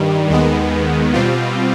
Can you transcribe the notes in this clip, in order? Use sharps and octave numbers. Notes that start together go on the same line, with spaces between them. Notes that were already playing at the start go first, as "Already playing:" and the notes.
Already playing: G2 D#3 G3
D#2 D#3 G#3 B3
B2 G3 C4 F4